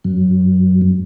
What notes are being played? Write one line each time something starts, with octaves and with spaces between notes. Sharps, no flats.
F#2